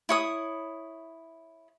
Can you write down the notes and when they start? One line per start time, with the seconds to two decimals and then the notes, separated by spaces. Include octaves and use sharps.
0.09 E4 C#5 D#6